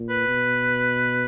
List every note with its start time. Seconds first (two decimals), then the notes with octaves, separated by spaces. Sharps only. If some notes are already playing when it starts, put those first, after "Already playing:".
Already playing: A#2
0.10 B4
0.28 B2